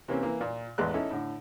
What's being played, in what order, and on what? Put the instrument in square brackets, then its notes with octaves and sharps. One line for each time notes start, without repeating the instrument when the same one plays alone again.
[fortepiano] C3 E3 A#3 C4 C#4
E3 A#3
A#2
A1 E2 G#3 B3 C6 F#6
C#4 D#4 E4 A4
A2 D3